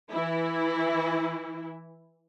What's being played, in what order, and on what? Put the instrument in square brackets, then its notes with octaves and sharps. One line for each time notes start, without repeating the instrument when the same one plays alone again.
[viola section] E3 E4